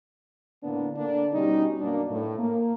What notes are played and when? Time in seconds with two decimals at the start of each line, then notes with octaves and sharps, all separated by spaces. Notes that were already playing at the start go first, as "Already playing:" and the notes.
0.63 A2 D3 A#3 B3 D4
0.95 D3 A#3 D4
1.33 B2 G3 C#4 D#4
1.79 F#2 B2 A#3 D4
2.10 A2
2.38 A#3